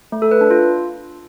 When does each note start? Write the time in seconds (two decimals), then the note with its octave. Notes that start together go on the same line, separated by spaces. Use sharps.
0.12 A3
0.22 A4
0.31 B4
0.41 D4
0.51 F4